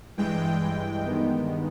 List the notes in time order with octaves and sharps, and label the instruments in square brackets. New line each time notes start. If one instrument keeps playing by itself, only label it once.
[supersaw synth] G2 E3 G#3 G5
G2 D#3 G#3 B3